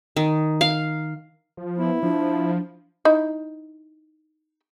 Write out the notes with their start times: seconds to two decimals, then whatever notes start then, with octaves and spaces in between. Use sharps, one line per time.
0.16 D#3
0.61 F5
1.57 F3
1.78 B3 E4
2.03 F3 D4
3.05 D#4 E4